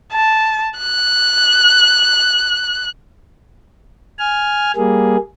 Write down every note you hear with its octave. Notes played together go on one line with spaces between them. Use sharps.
A5
F#6
G#5 F6
G3 A#3 G#4